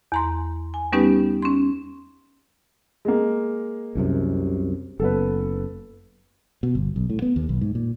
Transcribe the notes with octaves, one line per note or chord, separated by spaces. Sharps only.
E2 A#5 C6
G#5
G3 B3 C#4 D#4 G4 B4
C#4 C6
G#3 A#3
C2 F#2 C3
F#1 B3 A4 B4
B2
G1
B1
A2
B3
D#2
B1
G#2
A#2